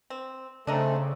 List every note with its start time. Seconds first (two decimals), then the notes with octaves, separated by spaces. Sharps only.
0.10 C4
0.67 C#3 A3 C4 D4 A4 D#5 A#5